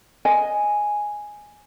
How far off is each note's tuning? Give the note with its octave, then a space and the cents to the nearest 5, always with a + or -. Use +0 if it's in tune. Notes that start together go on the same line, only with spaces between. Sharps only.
D#5 +0 G#5 +0